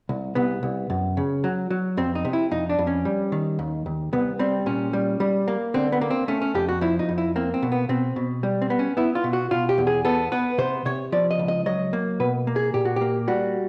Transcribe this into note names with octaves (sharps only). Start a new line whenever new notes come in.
C2
C2 B3
C2
F#2
C#3
F#3
F#3
F2 C4
D#4
C3
E4
F2 D#4
D4
F2
C#4
G3
D#3
D#2
D#2
C2 B3
G3 C4
A#2 C#4
G3
G3
A#3
D3 C4
B3
A#3
C4
A3 C#4
C#4
F2 G4
F#4
F3 E4
D#4
F2
E4
A#3 C4
C4
B2
B3
B2 C4
B2
G3
C4
B3
C#4
B3 E4
F4
B2
F#4
B2 F4
G4
E2
G#4
B3 A4
B3 B4
C3 C5
C3 C#5
F3 D5
D#5
C#2
D#5
F#3 D#5
A#3
B2 B4
A#3
G#4
A#2 G4
F#4
A#3 G4
G3 F#4